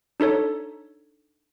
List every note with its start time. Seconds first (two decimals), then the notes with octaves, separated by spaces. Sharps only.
0.20 D4 D#4 A4 C#5